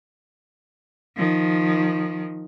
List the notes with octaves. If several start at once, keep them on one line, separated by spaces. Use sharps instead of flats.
D#3 F3